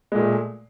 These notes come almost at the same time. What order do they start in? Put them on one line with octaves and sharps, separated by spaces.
G#3 A#2 A3